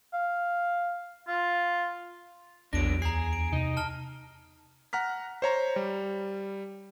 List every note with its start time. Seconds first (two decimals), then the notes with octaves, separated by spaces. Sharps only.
0.14 F5
1.28 F4
2.73 A#1 E2 F#3 D4 A#6 D7
3.02 D2 G#4 A#5 C7
3.33 D7
3.53 C3 D#4
3.77 A5 F6 G7
4.93 F#5 A#5 F6 B6
5.42 C5 C#5 A#5
5.76 G3